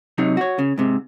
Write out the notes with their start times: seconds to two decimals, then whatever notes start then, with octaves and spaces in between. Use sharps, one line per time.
0.18 C3 F#3 D#4
0.37 F#4 C#5
0.59 C#3
0.78 G#2 C3